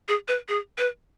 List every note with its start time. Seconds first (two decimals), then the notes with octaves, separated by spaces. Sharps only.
0.08 G#4
0.28 B4
0.48 G#4
0.78 B4